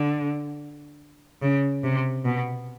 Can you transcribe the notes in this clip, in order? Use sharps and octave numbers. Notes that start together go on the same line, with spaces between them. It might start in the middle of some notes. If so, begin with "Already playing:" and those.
Already playing: D3
C#3
C3
B2